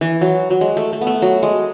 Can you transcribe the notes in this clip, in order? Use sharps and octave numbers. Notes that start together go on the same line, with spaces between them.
E3
F#3
F#3
G#3
A3
A3
B3
A3
F#3
G#3